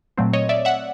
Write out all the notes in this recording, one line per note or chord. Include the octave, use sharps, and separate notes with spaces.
A#2 F#3 A3 C4
C#5 D#5
D5 E5
E5 F#5